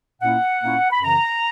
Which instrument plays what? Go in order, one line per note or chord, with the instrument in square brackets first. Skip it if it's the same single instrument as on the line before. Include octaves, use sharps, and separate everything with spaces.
[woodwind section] A#2 A#3 C#4 E4 F#5
A#2 A#3 C#4 E4
B5
F#2 C#3 E3 A#5